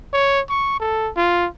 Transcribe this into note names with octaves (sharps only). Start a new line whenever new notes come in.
C#5
C#6
A4
F4